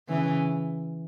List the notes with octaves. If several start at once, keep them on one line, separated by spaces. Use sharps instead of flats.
C#3 E3